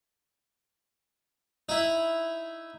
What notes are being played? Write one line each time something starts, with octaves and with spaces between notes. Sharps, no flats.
D#4 E4